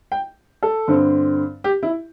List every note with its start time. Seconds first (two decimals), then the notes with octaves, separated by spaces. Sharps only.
0.12 G5
0.63 A4
0.88 G2 D3 C4
1.64 G4
1.83 E4